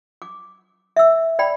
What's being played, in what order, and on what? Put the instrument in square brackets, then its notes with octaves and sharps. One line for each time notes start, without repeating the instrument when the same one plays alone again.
[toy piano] D6
E5 E6
D5 G5 B5